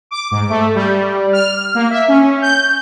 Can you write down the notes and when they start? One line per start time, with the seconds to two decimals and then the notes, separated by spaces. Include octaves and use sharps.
0.11 D6
0.31 G#2
0.50 A3
0.75 G3
1.33 F6
1.75 A#3
1.90 E5
2.08 C#4
2.42 G6